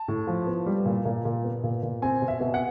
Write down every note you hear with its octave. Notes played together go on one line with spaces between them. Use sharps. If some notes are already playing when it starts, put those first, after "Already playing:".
Already playing: A5
A2
F3
B3
G3
A#2
A#2
A#2
B3
A#2
A#2
C4 G#5
B2
E5
B2
F#5